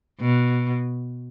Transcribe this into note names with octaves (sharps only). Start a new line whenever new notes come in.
B2